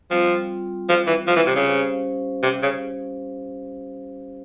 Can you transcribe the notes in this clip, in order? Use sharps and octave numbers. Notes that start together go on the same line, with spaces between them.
F3 G3 C4 F4
F3
E3
F3
E3
C3
C#3
G3 C#4 G4 C5 F5
C3
C#3